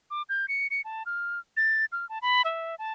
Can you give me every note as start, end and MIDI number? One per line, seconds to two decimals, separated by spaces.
0.11 0.22 86
0.29 0.46 91
0.48 0.67 97
0.70 0.81 97
0.85 1.03 81
1.06 1.39 89
1.57 1.85 93
1.92 2.08 89
2.09 2.19 81
2.22 2.42 83
2.45 2.75 76
2.79 2.93 81